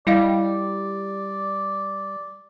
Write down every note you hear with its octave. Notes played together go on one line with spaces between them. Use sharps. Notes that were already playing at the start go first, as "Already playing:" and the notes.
G3 E4 D5 D#5 F5